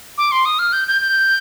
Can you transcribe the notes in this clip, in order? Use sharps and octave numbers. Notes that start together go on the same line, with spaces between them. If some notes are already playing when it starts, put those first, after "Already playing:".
D6
C6
D#6
F6
G6
G6
G6